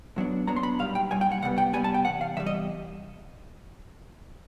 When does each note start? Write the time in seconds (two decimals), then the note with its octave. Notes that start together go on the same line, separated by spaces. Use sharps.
0.16 A2 F#3 B3 D4
0.47 A2 F#3 B3 D4 A#5
0.56 C6
0.63 B5
0.79 B1 A#2 G3 F5
0.95 G5
1.11 B1 A#2 G3 G#5
1.21 G5
1.32 F#5
1.42 C2 B2 G3 B3 F#5
1.58 G5
1.73 C2 B2 G3 B3 G#5
1.84 A5
1.94 G5
2.05 E2 C3 F#5
2.21 F5
2.37 E2 C3 G3 E5
2.46 D#5